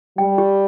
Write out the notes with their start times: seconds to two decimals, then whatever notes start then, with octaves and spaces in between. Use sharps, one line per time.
0.18 G3 G5
0.38 G4